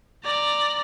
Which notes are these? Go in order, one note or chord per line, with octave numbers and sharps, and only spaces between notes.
D5 A#5